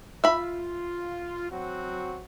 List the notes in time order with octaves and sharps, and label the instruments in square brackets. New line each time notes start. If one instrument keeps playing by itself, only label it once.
[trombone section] F4 [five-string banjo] E5 B5
[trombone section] F#3 C4 F#4